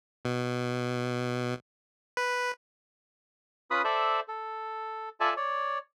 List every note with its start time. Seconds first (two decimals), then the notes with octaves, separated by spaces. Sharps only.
0.25 B2
2.17 B4
3.71 C#4 F4 B4 B5 D#6
3.84 A4 C5 D5 E5
4.28 A4
5.20 F4 A4 D5 E5 G#5 A5
5.37 C#5 D5